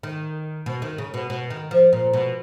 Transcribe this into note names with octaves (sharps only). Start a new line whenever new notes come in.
D#3
B2
D#3
C#3
B2
B2
D#3
F3
A#2
B2